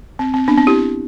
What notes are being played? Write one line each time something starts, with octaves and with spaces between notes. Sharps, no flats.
C4
C4
B3 D4
C4
E4 G4